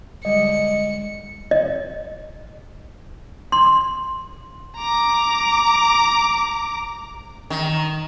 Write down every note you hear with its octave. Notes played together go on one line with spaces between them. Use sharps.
D3 G3 G#3 D#5 C#7
D#5
C6
A#5 D6
D#3